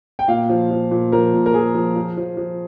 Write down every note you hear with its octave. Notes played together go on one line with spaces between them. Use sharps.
G5
A#2 F5
F3
F3
A#2
F3 A#4
A#2
A#4
F3 G#4
F3
F3
F3
F3